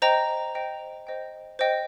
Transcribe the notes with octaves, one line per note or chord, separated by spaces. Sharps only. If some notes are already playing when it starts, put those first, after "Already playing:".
C5 D#5 G5 A#5
C5 D#5 G5
C5 D#5 G5
C5 D#5 G5